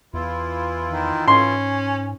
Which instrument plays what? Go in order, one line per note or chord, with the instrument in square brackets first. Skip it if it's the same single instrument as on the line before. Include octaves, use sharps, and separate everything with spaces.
[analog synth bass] E2 [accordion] E3 E4 F4
[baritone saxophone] D#3
[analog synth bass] G#2 [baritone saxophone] C#4 [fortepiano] C6